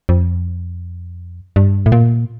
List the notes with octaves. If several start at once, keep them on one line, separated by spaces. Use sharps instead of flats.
F2
G2
A2
A#2